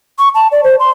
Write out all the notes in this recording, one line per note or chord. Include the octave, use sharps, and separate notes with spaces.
C#6
A5
D5
C5
C6